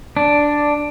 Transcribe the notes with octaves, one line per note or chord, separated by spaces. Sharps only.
D4